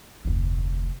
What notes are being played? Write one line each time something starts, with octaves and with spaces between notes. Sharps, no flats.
F1 D2